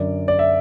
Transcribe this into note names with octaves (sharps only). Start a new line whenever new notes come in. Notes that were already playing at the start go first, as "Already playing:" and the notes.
Already playing: F#2 D3 D5
D5
E5